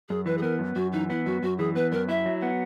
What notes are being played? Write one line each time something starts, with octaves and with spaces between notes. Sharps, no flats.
F#2 G#4
E3 B4
G#4
B3 A#4
F#2
F#2 F#4
E3 D#4
B3 E4
F#2 F#4
F#2 F#4
E3 G#4
B3 B4
F#2 A#4
E4 E5
F#3
B3 F#5